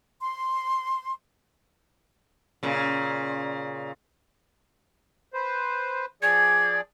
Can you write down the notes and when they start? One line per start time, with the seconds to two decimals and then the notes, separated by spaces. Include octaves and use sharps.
0.21 C6
2.63 A#2 C#3
5.34 B4 C5
6.22 F3 G#4 D5 G#6